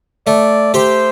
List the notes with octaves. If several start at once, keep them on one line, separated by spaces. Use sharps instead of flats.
A3 D5
G4 C5